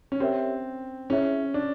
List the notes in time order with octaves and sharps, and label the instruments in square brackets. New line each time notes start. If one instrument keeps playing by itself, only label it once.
[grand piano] C#4
[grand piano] C4 [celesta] G4 A#4 C#5 E5
[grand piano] C#4 [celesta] E4 G#4 C#5 E5
[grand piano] D4